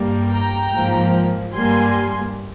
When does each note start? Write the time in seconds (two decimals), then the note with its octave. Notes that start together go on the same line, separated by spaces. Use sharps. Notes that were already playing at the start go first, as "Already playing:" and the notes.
Already playing: G2 G3 A#3
0.32 G5 A#5
0.73 G#2 F3 A#3
1.56 G2 G3 A#3 G#5 C6